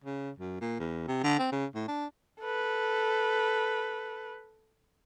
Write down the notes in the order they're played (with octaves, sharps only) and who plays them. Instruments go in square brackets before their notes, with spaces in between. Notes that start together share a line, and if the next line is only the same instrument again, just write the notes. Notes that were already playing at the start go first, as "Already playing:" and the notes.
[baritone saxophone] C#3
F#2
A#2
E2
C3
D3
C4
C#3
A2
D4
[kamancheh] A4 B4